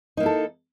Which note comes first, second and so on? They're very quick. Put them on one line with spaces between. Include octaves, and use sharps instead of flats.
D#4 A#3 E4 A4